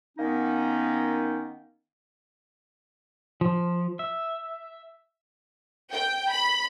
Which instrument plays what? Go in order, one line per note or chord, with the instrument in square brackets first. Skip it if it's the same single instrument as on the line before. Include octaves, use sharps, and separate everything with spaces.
[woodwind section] D#3 A#3 B3 C#4 D#4
[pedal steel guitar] F3
E5
[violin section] G5
B5